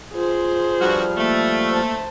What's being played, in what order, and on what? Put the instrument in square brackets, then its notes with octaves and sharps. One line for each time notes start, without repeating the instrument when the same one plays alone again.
[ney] F4 [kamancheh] G#4 C5
[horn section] G2 F#4 [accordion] F3 G3 F6
[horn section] A3 [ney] A#3
[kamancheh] C5 A5